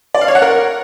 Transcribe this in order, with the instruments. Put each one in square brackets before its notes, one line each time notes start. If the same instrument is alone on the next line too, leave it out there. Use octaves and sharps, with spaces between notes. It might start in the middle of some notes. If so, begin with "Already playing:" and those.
[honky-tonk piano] D5
F5
C#5
F#5
A#4